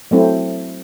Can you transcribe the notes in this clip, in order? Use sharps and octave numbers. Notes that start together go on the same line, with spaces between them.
F#3 A3 C4 E4